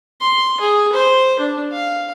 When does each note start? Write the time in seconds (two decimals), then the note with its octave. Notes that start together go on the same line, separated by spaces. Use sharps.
0.21 C6
0.60 G#4
0.92 C5
1.39 D4
1.72 F5